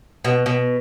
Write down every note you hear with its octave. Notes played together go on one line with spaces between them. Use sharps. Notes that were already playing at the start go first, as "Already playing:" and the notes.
B2
B2